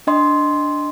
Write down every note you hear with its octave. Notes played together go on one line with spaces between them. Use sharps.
D4 D#5 C6